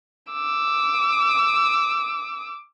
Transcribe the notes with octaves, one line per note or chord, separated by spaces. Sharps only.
D6 E6